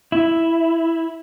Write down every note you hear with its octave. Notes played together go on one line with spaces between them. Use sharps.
E4